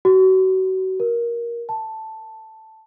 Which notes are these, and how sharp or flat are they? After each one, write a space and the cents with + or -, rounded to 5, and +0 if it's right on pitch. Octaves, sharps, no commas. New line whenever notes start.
F#4 +30
A#4 +15
A5 +0